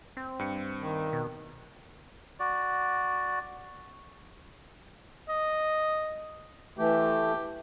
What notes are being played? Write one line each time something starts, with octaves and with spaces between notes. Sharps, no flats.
C4
G2 C#7
D#3
B2
F#4 D5
D#5
E3 A3 G4